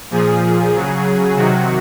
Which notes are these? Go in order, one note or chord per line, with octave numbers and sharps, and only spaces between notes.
A#2 F3 G#4
C#3 F#3
C3 D#3 F#3 F#4